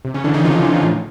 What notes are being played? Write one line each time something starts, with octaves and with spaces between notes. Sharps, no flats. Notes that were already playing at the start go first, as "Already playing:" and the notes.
C3
C#3 C#4
D3 E3 D4
D#3 D#4
C3 F3 F4
E3
A2